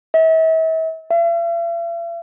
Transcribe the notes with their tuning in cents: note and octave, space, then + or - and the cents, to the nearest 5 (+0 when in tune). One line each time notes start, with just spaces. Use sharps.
E5 -40
E5 +45